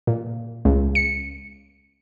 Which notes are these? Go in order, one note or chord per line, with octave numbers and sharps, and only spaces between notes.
A#2
C#2
C#7